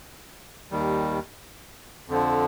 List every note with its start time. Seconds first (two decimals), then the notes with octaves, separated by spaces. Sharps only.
0.71 D#2 D#3 G3
2.08 F2 D3 F3